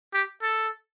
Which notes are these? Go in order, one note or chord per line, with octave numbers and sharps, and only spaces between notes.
G4
A4